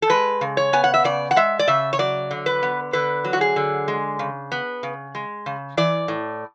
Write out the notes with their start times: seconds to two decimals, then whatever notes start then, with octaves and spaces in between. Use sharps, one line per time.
0.02 A4
0.10 G#3 B4
0.41 C#3
0.57 C#5
0.73 B3 G#5
0.84 F#5
0.94 E5
1.04 C#3 D5
1.31 F#5
1.36 G#3 E5
1.59 D5
1.68 C#3 E5
1.93 C#5
1.99 F#3 D5
2.31 D3
2.46 B4
2.63 B3
2.93 D3 B4
3.25 F#3
3.33 F#4
3.41 G#4
3.56 D3
3.88 G#3
4.19 C#3
4.52 B3
4.83 C#3
5.15 G#3
5.46 C#3
5.77 E3 D5
6.08 A2